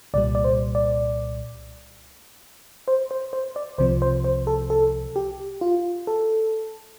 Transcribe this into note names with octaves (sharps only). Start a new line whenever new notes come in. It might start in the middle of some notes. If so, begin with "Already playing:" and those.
C2 A#2 G3 D5
D5
C5
D5
C5
C5
C5
D5
C2 C3 F3 C5
C5
C5
A4
A4
G4
F4
A4